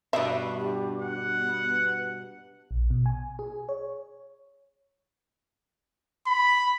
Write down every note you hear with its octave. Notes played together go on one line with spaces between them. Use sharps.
G2 B2 E5
G4
F#5
B3
B4
A#1
B2
G#5
G#4
C#5
B5